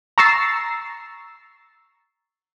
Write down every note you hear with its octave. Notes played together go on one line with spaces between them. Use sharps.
A#5 C#6 E6 A6 C7